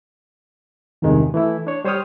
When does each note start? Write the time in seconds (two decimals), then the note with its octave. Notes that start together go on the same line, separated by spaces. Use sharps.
1.02 E2 G2 C3 D#3 G#3
1.34 E3 A3 E4
1.67 D4 C#5
1.85 G3 C5 C#5 G5 D#6 F6